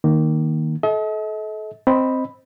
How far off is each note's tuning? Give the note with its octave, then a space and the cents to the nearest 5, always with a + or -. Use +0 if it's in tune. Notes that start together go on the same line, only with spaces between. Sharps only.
D#3 +0 A#3 +0
A4 -30 D#5 +45
C4 +0 D#5 +0 B5 +0